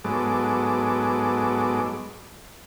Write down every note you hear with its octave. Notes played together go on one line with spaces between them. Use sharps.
G#2 F#3 G#3 B3 A4 D6